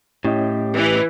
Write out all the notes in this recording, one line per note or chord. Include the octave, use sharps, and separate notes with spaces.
A2 C#4 E4 G4 D#5
E3